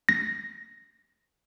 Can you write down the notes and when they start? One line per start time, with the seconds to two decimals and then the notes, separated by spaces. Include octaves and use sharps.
0.09 A#6